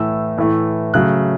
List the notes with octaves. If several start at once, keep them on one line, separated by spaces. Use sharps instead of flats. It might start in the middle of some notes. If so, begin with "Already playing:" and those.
Already playing: A2 E3 A3 E6
A2 E3 A3
C#3 F#3 A3 F#6